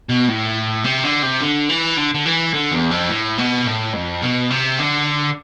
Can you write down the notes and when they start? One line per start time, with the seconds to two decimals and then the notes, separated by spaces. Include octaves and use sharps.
0.09 B2
0.28 A2
0.84 C3
1.04 D3
1.22 C3
1.41 D3
1.70 E3
1.97 D3
2.14 D3
2.26 E3
2.54 D3
2.72 E2
2.91 F2
3.10 A2
3.38 B2
3.66 A2
3.94 F2
4.22 B2
4.50 C3
4.78 D3